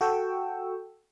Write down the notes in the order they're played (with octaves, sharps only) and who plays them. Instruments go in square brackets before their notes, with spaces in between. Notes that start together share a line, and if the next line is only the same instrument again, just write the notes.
[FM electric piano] F#4 A4 G5 C#6 E6